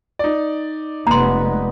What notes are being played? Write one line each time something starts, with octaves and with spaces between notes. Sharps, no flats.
D#4 D5
F1 G#3 A#3 B3 A#5 C6